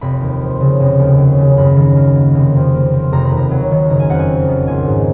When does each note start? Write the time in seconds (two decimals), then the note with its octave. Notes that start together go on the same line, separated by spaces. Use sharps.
0.01 F1 B5
0.21 D#2
0.41 F3
0.61 C#3
0.80 F1
0.99 D#2
1.18 F#3
1.38 C#3
1.57 F#2 B5
1.76 D#3
1.96 A#3
2.15 F#3
2.35 F1
2.55 F2
2.73 A#3
2.93 F3
3.12 F1 A#5
3.25 B5
3.31 D#2
3.37 A#5
3.51 F#3
3.71 D#3
3.89 F#1 A#5
4.00 G#5
4.09 F2 F#5
4.19 G#5
4.29 F#3
4.48 D#3
4.67 A#1 G#5
4.87 G#2